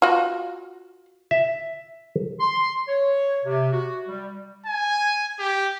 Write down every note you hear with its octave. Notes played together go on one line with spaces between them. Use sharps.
F4 F#4
E5
C6
C#5
C3
F#4
G3
G#5
G4